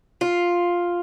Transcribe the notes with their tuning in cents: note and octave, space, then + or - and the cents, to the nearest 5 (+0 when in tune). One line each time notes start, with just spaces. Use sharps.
F4 +5